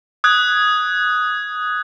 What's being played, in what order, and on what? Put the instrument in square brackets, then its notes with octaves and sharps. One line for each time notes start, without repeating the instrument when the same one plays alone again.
[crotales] D#6 F#6 G#6